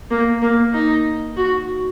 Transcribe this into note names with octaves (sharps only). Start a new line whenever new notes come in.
A#3
A#3
D#4
F#4